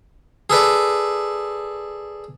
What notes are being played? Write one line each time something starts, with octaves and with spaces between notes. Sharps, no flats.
G#4 A4 B4 D5